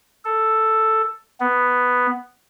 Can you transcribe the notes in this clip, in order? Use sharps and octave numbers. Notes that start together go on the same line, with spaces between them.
A4
B3